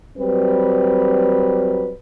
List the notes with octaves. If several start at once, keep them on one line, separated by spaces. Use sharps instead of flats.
F#3 G3 C4 B4